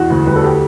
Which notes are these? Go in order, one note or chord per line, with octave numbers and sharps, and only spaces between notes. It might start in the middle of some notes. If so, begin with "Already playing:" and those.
Already playing: E2 F#4
D2
G3 B4
A4
G4